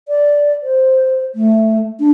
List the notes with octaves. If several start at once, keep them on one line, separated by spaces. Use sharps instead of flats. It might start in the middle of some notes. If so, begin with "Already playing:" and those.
D5
C5
A3
D4